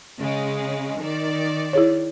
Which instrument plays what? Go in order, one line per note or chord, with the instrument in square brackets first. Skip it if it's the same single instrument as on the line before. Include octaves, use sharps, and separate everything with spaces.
[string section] C#3 G#3
D#3 D5
[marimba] E4 G#4 C#5